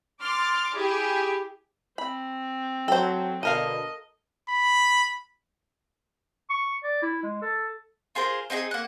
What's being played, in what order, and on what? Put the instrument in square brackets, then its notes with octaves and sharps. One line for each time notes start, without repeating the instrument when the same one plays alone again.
[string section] C6 D6 F6 A6
E4 G4 G#4
[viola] C4 [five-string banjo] B5
[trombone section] F#3 [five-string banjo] A4 C5 [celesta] G5
[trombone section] B2 D3 [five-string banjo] A4 A#4 F5 [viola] D#5 [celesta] D#7
[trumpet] B5
[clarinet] C#6
D5
E4
G#3
A4
[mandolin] F4 G#4 A#4 C5
C4 D#4 G4 G#4
A#3 F#5